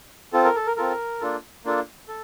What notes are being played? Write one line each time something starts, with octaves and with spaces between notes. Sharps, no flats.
C4 F4 A4
A#4
A4
A#4
C4 F4 A4 A#4
A#3 D4 F4 A4
A#3 D4 F4 A4
A4